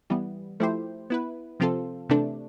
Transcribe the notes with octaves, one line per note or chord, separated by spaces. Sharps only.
E3 G3 B3
F3 A3 E4 G4 C5
B3 E4 B4
C3 F3 C4 F4 A4
C3 E3 A3 D4